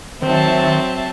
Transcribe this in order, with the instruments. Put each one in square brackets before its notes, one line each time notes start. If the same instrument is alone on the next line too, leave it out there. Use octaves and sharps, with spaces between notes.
[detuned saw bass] D#3 [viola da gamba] F#3 C4 [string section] C5 E5 A5